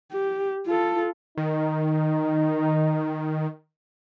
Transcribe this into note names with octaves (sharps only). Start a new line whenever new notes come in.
G4
F4 A4
D#3 D#4